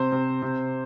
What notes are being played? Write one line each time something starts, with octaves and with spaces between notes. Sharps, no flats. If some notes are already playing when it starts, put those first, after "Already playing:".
Already playing: C3 C5
C3
C3